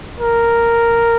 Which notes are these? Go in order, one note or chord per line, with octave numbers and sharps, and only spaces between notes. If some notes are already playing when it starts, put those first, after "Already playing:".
A#4